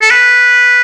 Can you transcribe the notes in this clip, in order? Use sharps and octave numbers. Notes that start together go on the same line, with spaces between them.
A4
B4